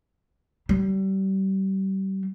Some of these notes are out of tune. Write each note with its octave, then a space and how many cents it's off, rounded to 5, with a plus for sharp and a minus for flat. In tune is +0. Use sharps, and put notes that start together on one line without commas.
G3 -30